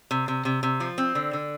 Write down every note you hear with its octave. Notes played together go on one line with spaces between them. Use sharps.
C3
C3
C3
C3
F3
C4
D3
D3